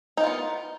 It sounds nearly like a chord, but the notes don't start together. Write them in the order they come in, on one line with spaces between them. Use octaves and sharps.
D#4 D#3 F4 B3